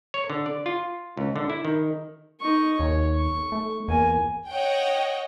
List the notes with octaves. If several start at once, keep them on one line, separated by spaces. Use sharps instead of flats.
C#5
D3
D5
F4
C#2
D3
E4
D#3
D#4 C#6
D#2 C#5
C#6
A3
E2 A#3 G#5
C#5 D#5 F#5 G5